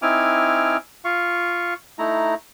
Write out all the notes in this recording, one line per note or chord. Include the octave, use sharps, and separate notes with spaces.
C4 D#4 E4 G#5 D6 F6
F4 F5 C#6
A3 D#4 E4 A#5